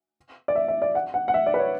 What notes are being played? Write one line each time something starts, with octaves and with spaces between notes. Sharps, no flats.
D5
E5
E5
D5
F#5
F#5
F#5
E5
D5
B4
C#5